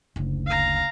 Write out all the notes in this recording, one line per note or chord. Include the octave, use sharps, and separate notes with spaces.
F#1 D2
F5 A#5